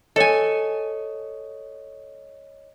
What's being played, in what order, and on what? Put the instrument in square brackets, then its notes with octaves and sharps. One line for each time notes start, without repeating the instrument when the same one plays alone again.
[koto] A4 G#5 [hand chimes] C#5 D#5